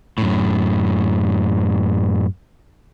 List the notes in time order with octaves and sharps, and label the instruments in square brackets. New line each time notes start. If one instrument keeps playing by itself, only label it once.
[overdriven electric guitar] F#2 A2